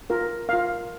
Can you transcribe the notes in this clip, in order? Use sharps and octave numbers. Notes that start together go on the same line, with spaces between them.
F4 A#4
F4 A#4 F5